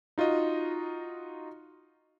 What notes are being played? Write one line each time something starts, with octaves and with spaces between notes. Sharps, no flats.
D#4 F4 F#4 D#5